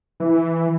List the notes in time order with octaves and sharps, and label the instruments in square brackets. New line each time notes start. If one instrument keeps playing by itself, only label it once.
[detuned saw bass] E3